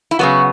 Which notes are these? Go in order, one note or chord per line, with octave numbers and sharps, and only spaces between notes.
E4
C#3 F#3 B3 F#4